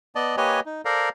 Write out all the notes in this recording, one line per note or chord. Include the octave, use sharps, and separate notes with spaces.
B3 D5 D#5 A5
A#3 G4 B4 C#5 D#5 G#5
D#4
A4 A#4 C5 D5 F5 A#5